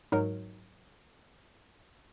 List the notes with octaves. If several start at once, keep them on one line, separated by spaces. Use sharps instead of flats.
G#2 F#3 D#4 A#4